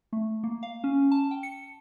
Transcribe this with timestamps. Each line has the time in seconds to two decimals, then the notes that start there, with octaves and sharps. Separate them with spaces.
0.13 A3
0.44 A#3
0.63 F5
0.84 C#4
1.12 A5
1.31 G5
1.43 C#7